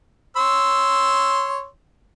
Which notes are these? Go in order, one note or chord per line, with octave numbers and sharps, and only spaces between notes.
C#5 C6 E6